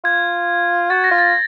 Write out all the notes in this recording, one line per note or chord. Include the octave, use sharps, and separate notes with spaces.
F4 G#6
F#4 A6
A#6
F4
A6